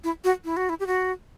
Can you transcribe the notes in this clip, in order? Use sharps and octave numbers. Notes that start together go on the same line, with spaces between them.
E4
F#4
E4
F#4
E4
G4
F#4